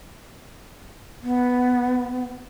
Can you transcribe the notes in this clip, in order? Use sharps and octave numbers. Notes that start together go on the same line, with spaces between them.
B3